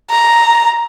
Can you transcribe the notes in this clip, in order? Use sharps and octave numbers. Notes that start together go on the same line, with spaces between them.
A#5